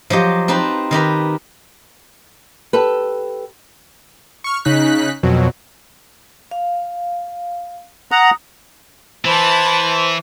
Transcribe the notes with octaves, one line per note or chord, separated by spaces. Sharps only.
F3 F#3 G4 D#5
C4 D#4 B4 A5
D#3 D#4 G4 B4
G4 A4 B4
C#6 F6
C#3 D#4 F#6 B6
F2 B2 F#3
F5
F#5 A#5 D#6
E3 B4 C5 A5